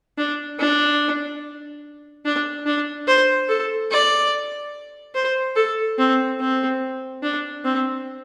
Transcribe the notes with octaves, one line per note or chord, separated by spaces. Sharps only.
D4
D4
D4
D4
C5
A4
D5
C5
A4
C4
C4
D4
C4